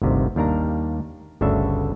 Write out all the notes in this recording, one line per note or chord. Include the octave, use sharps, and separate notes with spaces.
G1 D2 C3 D#3
D#2 G3 D4 A#4 F5 A#5
G1 D2 C#3 D4 A4 E5